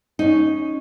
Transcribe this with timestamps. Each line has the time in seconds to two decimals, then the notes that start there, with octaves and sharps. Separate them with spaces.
0.19 C#4 D#4